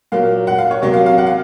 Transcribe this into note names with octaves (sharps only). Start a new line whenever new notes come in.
A#2 F#3 A#3 F5
F#5
F5
C#5
C3 F#3 A#3 C#5
F5
F5
F#5
F5